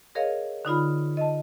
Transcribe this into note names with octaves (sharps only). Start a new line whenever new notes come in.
G#4 A#4 C#5 D#5 F5
D3 D#4 F4 B5
D#5 A5